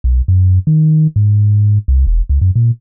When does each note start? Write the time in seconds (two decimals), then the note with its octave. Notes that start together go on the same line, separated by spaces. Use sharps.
0.04 B1
0.28 F#2
0.67 D#3
1.16 G#2
1.88 C2
2.07 E1
2.29 C#2
2.41 F#2
2.56 A#2